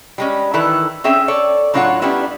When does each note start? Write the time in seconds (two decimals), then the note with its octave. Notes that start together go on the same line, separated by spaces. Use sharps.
0.18 G3 G#3 C#4
0.54 D#3 E3 E4 A4 B4
1.04 C4 C#4 G#4 E5 G5
1.28 A4 C#5 D5
1.74 A2 F#3 D4 F4 C#5 F#5
2.02 G3 B3 C#4 D4 E4